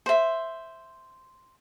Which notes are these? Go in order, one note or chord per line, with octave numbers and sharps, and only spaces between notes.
C5 E5